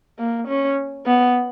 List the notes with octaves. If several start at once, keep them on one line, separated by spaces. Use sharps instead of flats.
A#3
C#4
B3